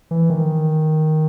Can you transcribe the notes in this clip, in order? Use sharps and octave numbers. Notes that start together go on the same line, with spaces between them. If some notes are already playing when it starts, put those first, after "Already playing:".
E3
D#3